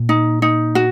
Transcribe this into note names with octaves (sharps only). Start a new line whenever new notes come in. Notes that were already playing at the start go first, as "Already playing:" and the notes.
Already playing: A#2
D#4
D#4
F#4